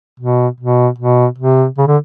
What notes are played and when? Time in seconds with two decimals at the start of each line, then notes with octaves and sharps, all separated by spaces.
0.20 B2
0.60 B2
0.99 B2
1.38 C3
1.78 C#3
1.87 D3